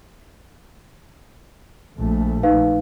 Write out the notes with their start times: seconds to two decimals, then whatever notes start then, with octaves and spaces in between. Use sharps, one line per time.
1.98 A#1 A3
2.43 D#4 B4 F5